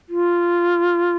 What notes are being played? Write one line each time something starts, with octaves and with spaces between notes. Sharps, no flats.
F4